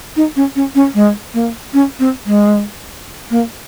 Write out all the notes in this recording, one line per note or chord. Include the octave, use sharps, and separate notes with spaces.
D#4
C#4
C#4
C#4
G#3
A#3
C#4
C4
G#3
A#3